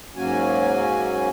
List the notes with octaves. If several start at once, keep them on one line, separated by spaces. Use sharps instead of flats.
G#2 F#3 A#3 C#4 F#4 G#5